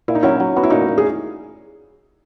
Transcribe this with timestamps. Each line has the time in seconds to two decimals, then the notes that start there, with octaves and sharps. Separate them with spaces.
0.08 A#2 E4
0.15 D#4
0.23 F#3 C#4 E4
0.40 F#3
0.56 B3 F#4
0.63 E4
0.70 A#2 D#4 F#4
0.89 A#2
0.98 G#4